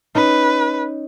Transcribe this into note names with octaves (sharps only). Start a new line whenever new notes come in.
C#4 D#4 B4